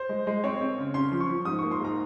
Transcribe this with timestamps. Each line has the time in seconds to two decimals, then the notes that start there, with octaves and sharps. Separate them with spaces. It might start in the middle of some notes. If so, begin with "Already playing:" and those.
Already playing: C5
0.09 G#3
0.27 G#3
0.44 C4 C#5
0.61 C4
0.78 C#3
0.94 C#4 C6
1.12 F3
1.21 C#6
1.29 F3
1.45 G#2 D#6
1.59 C#6
1.63 A#3
1.71 C6
1.80 G#2 A#5